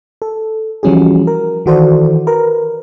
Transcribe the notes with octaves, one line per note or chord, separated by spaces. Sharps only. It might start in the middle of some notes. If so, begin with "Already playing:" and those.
A4
E3 F3 G3 C#4 F#4 G#4
A#4
D#3 E3 F#4 A4 C5 D5
A#4 B4